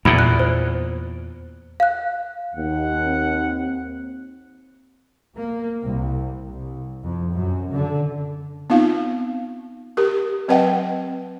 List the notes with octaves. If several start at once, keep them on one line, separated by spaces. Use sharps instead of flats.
E2 A#2 B5
F#6
C5
F5 F#6
D#2 F#5
C4
A#3
C2
C2
F2
F#2
D3
B3 C4 D#4 F4 F5
G4 A#4
F#3 C4 B4 D#5 F#5 G5